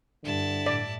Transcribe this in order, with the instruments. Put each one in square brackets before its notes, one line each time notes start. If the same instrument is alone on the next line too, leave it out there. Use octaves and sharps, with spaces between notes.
[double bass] G2 [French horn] D3 [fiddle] E4 A5
[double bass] A2 [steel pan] D5